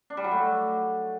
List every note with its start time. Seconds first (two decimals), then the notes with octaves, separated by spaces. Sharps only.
0.10 D4
0.17 G3
0.24 F#3
0.31 A3